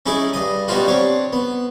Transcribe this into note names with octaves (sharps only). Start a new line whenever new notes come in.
C#4 D#4 E4 G#4 D5
G2 D#5 D#6
G3 B3 C#4 D#4 F4 F#4
C4 D4 C#5
B3